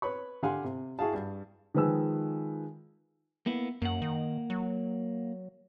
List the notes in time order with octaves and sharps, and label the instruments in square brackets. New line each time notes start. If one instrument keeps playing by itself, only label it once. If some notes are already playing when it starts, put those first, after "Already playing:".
[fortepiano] B4 C#5 B5 C#6
D3 G4 F5 F#5 G#5 C6
C3
E4 F#4 G#4 F5 A5
G2
[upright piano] D#3 F3 G#3 B4 G#5 E6
[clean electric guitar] A#3 B3 E4
[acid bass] F#2 [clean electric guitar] A#3 F#5
[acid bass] D#3
F#3